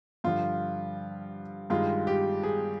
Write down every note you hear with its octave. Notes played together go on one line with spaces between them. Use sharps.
G2 D3 F3 F4
G2 D#3 G#3 F4
G4
G#4